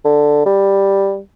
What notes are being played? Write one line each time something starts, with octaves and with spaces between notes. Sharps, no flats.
D3
G3